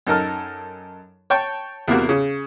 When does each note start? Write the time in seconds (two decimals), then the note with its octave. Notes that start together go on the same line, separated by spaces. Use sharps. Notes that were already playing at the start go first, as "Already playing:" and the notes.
0.07 F#2 D#4 A4 A#4 A5 F6
1.30 C#5 G5 A5 C#6
1.88 E2 C3 A#3 F#4
2.09 C#3